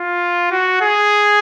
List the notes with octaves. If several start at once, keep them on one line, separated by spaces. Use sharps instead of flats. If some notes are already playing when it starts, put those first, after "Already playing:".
Already playing: F4
F#4
G#4